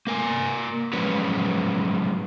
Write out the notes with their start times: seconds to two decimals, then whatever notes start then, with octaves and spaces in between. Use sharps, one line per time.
0.07 A#3 A#4 G#5
0.93 F3 F#3 G#3 C#4 B4 C#5